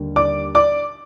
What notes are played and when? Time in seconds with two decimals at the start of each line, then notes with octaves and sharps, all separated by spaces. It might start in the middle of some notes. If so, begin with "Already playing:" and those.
Already playing: D#2 D3 G3
0.16 D5 D6
0.55 D5 D6